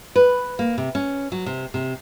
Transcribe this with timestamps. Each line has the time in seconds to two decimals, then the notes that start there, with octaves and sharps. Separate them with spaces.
0.16 B4
0.59 A#3
0.78 C3
0.95 C#4
1.32 F#3
1.46 C3
1.74 C3